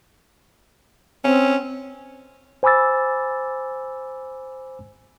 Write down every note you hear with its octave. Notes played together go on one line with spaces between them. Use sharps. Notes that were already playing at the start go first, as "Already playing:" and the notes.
C4 C#4
C5 G#5 B5 D6 E6 A6